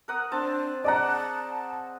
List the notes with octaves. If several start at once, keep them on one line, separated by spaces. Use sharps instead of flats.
A#4 F#5 D#6
C4 D4 A5
G#4 D5 D#5 F#5 A5 A#5